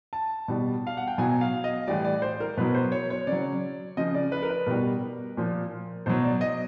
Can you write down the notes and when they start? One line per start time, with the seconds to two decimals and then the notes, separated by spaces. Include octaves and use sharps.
0.13 A5
0.48 B2 G3
0.87 F5
0.97 F#5
1.08 G5
1.18 B2 F#3 G#5
1.41 F5
1.64 D#5
1.88 A2 E3 G3 D5
2.05 D5
2.22 C5
2.40 A#4
2.57 B2 F#3 B4
2.75 C5
2.92 C#5
3.10 C#5
3.27 C#3 F#3 D5
3.97 C#3 F3 D#5
4.14 D5
4.32 B4
4.43 A#4
4.50 B4
4.67 B2 G3 A#4
5.37 A#2 F3
6.06 B2 F#3 C5
6.24 D5
6.41 D#5